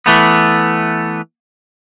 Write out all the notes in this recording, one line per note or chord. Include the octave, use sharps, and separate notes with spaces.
E3 A3 B3